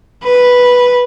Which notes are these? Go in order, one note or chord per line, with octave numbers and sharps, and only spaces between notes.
B4